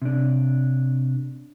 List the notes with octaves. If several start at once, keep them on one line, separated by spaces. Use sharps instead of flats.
C3 D4